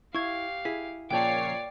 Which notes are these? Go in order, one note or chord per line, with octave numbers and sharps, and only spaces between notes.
E4 G4 F5 C#6 G#6
E4 G#4 B6
A#2 C#3 F3 C#5 D5 G5 A5 C7